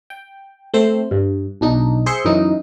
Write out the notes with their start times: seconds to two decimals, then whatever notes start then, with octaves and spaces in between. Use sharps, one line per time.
0.10 G5
0.74 A3 C4 C5
1.11 G2
1.61 B1 D4 D#4
2.06 G#4 C5 E5 C6 C#7
2.25 F#2 E3 D#4